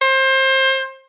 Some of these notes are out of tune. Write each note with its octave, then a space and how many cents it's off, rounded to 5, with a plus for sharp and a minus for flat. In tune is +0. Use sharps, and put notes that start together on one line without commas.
C5 +25